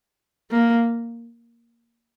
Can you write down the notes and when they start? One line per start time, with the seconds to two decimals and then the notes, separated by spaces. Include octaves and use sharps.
0.51 A#3